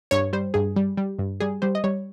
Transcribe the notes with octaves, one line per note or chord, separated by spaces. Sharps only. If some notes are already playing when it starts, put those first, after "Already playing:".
G2 C#5
G3 C5
G2 G#4
G3
G3
G2
G3 G#4
G3 C5
D#5
G3 C#5